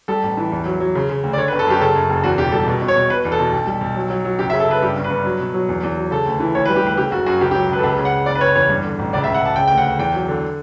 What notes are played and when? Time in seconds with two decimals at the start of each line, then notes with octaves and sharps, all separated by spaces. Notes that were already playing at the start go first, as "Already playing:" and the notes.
0.08 G3 A4
0.23 A1
0.37 E3
0.52 E2
0.65 F#3
0.80 F#3
0.95 C#3
1.10 C#3
1.23 D2
1.33 D5
1.37 D3 C#5
1.48 B4
1.53 G1
1.59 A4
1.67 F#2 G4
1.81 C#3 A4
1.96 F#2
2.09 F#1
2.24 E2 F#4
2.38 E1 G4
2.52 G3 A4
2.68 B2
2.82 B2
2.88 C#5
2.96 B2
3.10 B2 B4
3.25 E2
3.32 A4
3.39 B2
3.52 B1
3.67 G3
3.81 B1
3.96 F#3
4.10 F#3
4.25 F#3
4.39 F#1 G4
4.50 E5
4.53 C#3
4.60 A4
4.68 C#3 B4
4.82 G2 G4
4.97 G1
5.04 B4
5.10 G2
5.25 F#3
5.40 B2
5.54 F#3
5.69 E2
5.83 E2
5.97 F#3
6.11 C#3 A4
6.26 D2
6.40 E3
6.55 D2 C#5
6.65 B4
6.69 G3
6.76 G4
6.83 D2 B4
6.97 C#3 G4
7.11 F#1 F#4
7.26 F#2 F#4
7.41 C#2 G4
7.51 G4
7.55 F#3
7.69 C#2 B4
7.79 A4
7.83 C#2 B4
7.98 C#3
8.05 F#5
8.12 C#2
8.26 F#1 D5
8.35 B4
8.41 F#1 C#5
8.55 E2 C#5
8.69 G2
8.84 D3
8.99 A1
9.13 C#2 D5
9.24 E5
9.27 C#2
9.34 F#5
9.41 C#2 A5
9.56 C#3 G5
9.67 D2 G5
9.78 F#5
9.85 D2
9.99 E2 G5
10.14 F#3
10.28 D3